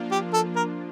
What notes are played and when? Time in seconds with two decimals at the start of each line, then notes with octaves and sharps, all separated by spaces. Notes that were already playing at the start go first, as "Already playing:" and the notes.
Already playing: F3 A#3 D4 F4
0.11 G4
0.33 A4
0.56 A#4